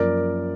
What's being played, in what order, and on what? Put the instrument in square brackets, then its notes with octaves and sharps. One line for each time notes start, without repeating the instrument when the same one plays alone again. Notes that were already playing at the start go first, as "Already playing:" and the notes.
Already playing: [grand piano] F#2 F3 A#3 A#4 D5